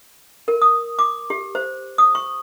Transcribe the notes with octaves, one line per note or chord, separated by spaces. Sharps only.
A#4
D#6
D6
G4
C5
D#6
C#6